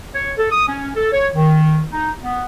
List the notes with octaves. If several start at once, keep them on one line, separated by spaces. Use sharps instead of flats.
C#5
A4
D#6
C#4
A4
C#5
D#3
D#4
B3